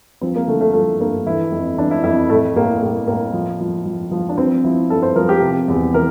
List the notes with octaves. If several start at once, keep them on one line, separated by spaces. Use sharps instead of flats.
F3 C4
A#3
D3 A3
A3
F3 A3
G2 A#3
E3 E4
F2
E3 D4
E4
F2 E4
A2 A3
A2 A#3
A2 A#3
A2 A#3
F3
F3
F3
F3
D4
F3 C4
F3 E4
G2 A4
C5
F3 A#4
G4
C3
E2
E3 A#4